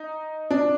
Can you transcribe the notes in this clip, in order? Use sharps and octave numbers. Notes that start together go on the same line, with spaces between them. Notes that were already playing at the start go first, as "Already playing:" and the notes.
Already playing: D#4
D4